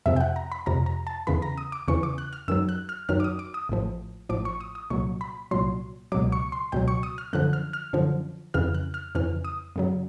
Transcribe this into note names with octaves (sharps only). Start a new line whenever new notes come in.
F2 C3 F3 E5
G5
F#5
A#5
B5
F2 C3 F3 A#5
A#5
A5
E2 C#3 E3 B5
A#5
D#6
D6
E2 C#3 E3 C#6
D6
F#6
F6
F#2 D#3 F#3 E6
F#6
F6
F#2 D#3 F#3 F6
D6
D#6
D6
D#6
A1 A2 F3
A1 A2 F3 D6
C#6
D#6
D#6
C2 A#2 F#3 C#6
B5
C2 A#2 F#3 C6
C#2 B2 F#3 D6
C#6
C6
C#2 B2 F#3 G5
C#6
D#6
F6
F#2 D3 F3 F#6
F6
F6
F#2 D3 F3
F2 C#3 E3 F6
F#6
F6
F2 C#3 E3 F6
D#6
F#2 C#3 F#3